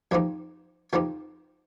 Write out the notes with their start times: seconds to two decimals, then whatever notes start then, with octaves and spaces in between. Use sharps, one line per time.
0.11 F2 F3 C4 D#4 G4
0.93 F2 F3 C4 D#4 G4